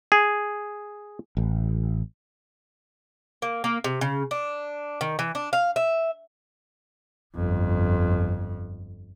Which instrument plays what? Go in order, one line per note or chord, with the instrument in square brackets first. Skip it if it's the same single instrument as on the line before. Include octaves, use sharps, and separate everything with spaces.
[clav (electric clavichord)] G#4
[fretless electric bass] A1
[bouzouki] A#3
A#3
C3
C#3
D4
D#3
E3
D4
F5
E5
[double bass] G1 F2